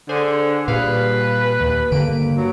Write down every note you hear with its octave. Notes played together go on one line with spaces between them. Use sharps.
D3 G#4 C5 G#5
A#2 G3 G#4 B4 F5
D#2
G2 D3 A#3 D7
F#3